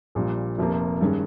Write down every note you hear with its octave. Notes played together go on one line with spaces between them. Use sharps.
A#1 A#2 G3 A#3
F1 F2 C3 F3 A#3
G2 D#3 G#3 C#4